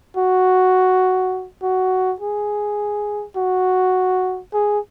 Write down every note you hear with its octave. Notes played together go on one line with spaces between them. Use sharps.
F#4
F#4
G#4
F#4
G#4